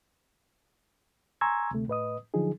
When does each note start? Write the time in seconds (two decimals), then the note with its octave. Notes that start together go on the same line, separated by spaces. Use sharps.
1.41 G#5 A#5 C6 C#6 E6 G#6
1.71 D2 C3 A3
1.88 A2 B4 D#5 D#6
2.34 D3 F3 F#3 D#4 G#4